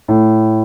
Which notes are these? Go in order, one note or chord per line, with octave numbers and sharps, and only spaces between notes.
A2